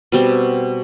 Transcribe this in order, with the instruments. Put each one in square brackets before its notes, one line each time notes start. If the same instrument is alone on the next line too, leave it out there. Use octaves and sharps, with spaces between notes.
[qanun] B2 G3 C4